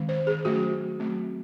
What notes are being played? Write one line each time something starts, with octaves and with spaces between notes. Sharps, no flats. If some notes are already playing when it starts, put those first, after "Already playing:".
Already playing: D#3 G#3 C4
C5
G#4
F#3 A3 C#4 F#4
F#3 A3 C4